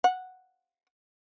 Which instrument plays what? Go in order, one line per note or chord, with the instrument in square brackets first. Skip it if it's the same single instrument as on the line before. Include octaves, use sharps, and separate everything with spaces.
[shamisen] F#5